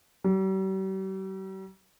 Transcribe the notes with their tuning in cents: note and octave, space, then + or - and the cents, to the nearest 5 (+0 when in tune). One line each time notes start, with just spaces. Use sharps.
G3 -45